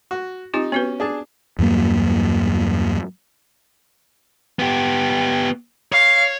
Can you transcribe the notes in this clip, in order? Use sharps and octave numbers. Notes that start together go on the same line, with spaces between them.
F#4
C4 D#4 F4 G4
B3 C#4 F#4 B4
D4 G#4 A5
E2 G2 F#3 A#3
B3 G4
C#5 F5